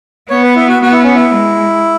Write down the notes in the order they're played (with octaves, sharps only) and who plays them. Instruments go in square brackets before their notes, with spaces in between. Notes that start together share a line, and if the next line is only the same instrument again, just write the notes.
[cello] B3 [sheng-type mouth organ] C#5
[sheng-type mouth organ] B4
E4
F#4
[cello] B3 [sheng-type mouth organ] F#4
[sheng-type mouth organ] E4
C#4
E4
[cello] G#3